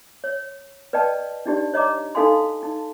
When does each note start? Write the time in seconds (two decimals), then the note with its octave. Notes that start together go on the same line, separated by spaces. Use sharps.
0.24 C#5
0.93 B4 D5 D#5 G5 A5
1.46 D4 D#4 G4 D5
1.74 C#5 D#5 A#5 D6
2.15 D#4 A4 F5 G#5 C6
2.63 D#4